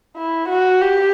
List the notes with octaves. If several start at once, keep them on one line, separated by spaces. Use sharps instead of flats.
E4
F#4
G4